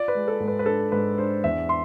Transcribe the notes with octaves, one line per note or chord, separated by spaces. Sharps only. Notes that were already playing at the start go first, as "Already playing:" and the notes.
Already playing: F4 D5
B4
G#3
A4
G#2
B4
B4
D4 A4
G#2 B4
D4 C5
E2 E5
C6